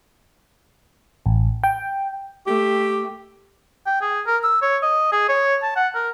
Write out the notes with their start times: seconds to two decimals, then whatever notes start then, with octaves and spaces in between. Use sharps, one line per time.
1.26 A1
1.64 G5
2.47 A3 G4
3.86 G5
4.02 G#4
4.27 A#4
4.44 E6
4.62 C#5
4.82 D#5
5.12 G#4
5.29 C#5
5.63 A5
5.76 F#5
5.95 A#4